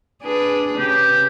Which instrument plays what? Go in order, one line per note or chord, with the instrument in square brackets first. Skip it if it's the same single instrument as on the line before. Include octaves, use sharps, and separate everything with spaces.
[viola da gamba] D4 G#4 B4
[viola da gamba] C#3 [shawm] G4